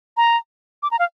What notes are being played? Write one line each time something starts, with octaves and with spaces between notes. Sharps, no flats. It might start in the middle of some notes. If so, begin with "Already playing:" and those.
A#5
D6
A#5
F5